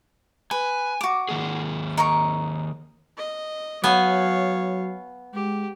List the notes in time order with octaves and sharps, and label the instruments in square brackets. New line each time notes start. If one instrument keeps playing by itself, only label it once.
[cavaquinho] B4 [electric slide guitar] G#5
[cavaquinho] F#4 D6
[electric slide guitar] D#3 A#3 G#4
[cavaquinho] D#4 A#4 C#6
[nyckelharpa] D#5
[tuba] F#3 [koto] B3 G#5 [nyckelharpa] C#5 F5
[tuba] G#3 [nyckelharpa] G4